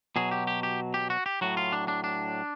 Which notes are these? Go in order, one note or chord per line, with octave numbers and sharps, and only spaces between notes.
B2 F#3 G#4
G4
G4
G4
G4
F#4
G4
A2 F#3 F#4
F4
D4
D4
D4